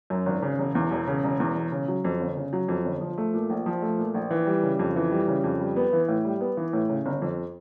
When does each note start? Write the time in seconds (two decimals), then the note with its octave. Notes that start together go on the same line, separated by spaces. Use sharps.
0.10 F#2
0.26 G#1
0.42 C#3
0.59 E1
0.75 E2
0.91 E1
1.07 C#3
1.24 E1
1.40 E2
1.55 E1
1.72 C#3
1.88 F#3
2.05 F2
2.20 G1
2.37 C#3
2.53 F#3
2.68 F2
2.85 G1
3.01 F3
3.18 A3
3.33 A#2
3.50 A#1
3.66 F3
3.82 A3
3.98 A#2
4.14 A#1
4.31 E3
4.47 G3
4.63 C#3
4.79 F2
4.96 E3
5.11 G3
5.28 C#3
5.44 F2
5.60 G3
5.76 B3
5.93 E3
6.08 A2
6.25 G3
6.41 B3
6.57 E3
6.73 A2
6.89 C#3
7.06 G1
7.22 F2